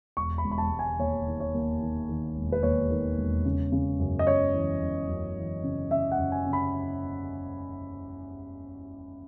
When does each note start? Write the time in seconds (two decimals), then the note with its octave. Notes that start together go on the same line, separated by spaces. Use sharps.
0.17 E1 C#6
0.38 B5
0.44 E1
0.51 B5
0.58 A5
0.72 E1
0.79 G#5
0.99 D#2 C#5
1.26 D#3
1.40 C#5
1.54 D#2
1.81 D#3
2.09 D#3
2.36 E1
2.52 B4
2.63 D#2 C#5
2.90 D#3
3.18 E1
3.45 C#3
3.72 C#3
4.00 F#2
4.19 D#5
4.27 F#2 C#5
4.54 E3
4.81 F#2
5.09 F#2
5.37 E3
5.63 C#3
5.91 C#3 E5
6.12 F#5
6.18 F#2
6.32 G#5
6.45 C#3
6.53 B5